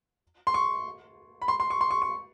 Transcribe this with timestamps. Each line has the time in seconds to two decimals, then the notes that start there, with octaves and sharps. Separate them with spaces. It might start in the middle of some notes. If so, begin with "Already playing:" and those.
0.47 C6
0.54 C#6
1.42 B5
1.48 C6
1.60 C6
1.70 C#6
1.81 C6
1.91 C#6
2.02 C#6